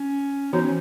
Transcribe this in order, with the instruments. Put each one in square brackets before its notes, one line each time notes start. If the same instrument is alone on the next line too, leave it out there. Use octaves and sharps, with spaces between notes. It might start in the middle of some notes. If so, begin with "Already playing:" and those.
Already playing: [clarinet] C#4
[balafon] E3 B3 F#4 C#5 [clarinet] D#4
[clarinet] C#4